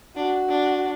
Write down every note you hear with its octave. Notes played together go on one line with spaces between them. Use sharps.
D4 F#4
D4